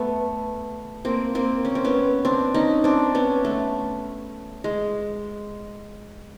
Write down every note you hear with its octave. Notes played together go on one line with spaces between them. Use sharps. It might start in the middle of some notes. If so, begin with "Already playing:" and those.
Already playing: A3 B3
A#3 C4
A#3 C4
C#4
C4
B3 C#4
C4 D4
C#4 D#4
C4 D4
B3 C#4
A3
G#3